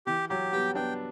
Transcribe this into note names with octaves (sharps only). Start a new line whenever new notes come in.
E3 G4
F#3 G4
G3 B3 G5
B3 D4 G5